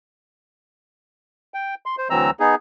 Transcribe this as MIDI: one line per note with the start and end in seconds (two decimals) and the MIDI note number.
1.54 1.75 79
1.86 1.96 84
1.98 2.08 72
2.10 2.30 38
2.10 2.30 52
2.10 2.30 54
2.10 2.30 60
2.10 2.30 82
2.10 2.30 88
2.40 2.55 59
2.40 2.55 63
2.40 2.55 68